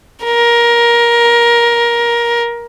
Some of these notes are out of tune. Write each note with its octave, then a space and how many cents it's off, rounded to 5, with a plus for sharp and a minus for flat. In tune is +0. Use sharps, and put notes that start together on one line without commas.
A#4 +20